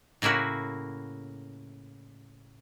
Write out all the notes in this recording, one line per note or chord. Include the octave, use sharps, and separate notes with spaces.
A2 C#3 A#3 E4 F#4